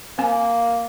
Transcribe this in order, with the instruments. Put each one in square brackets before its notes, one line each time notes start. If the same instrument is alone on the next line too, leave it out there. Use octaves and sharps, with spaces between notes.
[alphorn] A#3 [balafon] C4 G#5